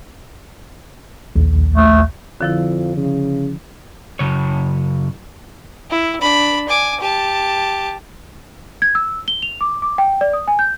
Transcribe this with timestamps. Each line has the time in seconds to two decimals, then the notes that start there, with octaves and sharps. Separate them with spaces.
1.36 A#1 D#2
1.76 A3
2.41 F2 D3 F3 E4
2.97 C#3
4.19 F#2 C#3 C#5
5.91 E4
6.21 D4 B5
6.68 G#5 D6
7.01 G4 A5
8.82 G#6
8.95 E6
9.28 G7
9.42 F7
9.61 D6
9.82 D6
9.98 G5
10.21 D5
10.33 D#6
10.48 G#5
10.59 G6